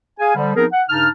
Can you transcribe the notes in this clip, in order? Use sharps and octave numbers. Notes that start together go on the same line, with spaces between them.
G#4 F5 G#5
D3 F3 G3
F3 B3 C4 D#4 G#4 A#4
F#5
G2 C#3 D#4 A5 F6